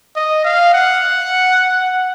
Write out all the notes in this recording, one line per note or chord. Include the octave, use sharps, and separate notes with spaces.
D#5
F5
F#5